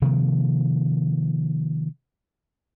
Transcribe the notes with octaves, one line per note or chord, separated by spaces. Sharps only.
C3 D#3 F3 A#3